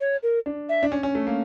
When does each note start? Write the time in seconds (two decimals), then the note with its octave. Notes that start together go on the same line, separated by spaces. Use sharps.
0.01 C#5
0.23 A#4
0.46 D4
0.69 E5
0.83 D4
0.92 C#4
1.03 C#4
1.15 A3
1.27 A#3